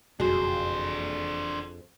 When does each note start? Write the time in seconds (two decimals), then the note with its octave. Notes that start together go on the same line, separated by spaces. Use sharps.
0.20 F#1 B1 F2 D4 F#4 G#4 C5